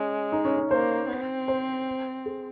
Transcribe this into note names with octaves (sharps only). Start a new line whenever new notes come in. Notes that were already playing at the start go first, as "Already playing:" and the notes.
Already playing: G#3 C#4
D#4
C#4
C#4
A#3 C5
C4
C5
G#4